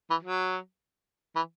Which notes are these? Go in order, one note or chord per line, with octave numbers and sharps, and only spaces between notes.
E3
F#3
E3